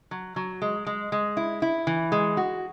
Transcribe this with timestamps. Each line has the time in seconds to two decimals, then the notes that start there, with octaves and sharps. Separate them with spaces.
0.11 F#3
0.36 F#3
0.62 G#3
0.86 G#3
1.12 G#3
1.37 E4
1.62 E4
1.87 E3
2.12 G#3
2.37 F#4